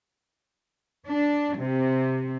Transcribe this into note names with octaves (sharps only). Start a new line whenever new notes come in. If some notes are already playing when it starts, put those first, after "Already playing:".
D4
C3